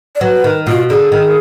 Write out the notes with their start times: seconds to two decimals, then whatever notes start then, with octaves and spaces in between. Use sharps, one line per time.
0.15 D5
0.21 F#3 B4
0.44 D#3
0.67 B2 F4
0.90 D3 G#4
1.12 D#3